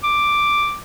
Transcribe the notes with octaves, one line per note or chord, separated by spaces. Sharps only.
D6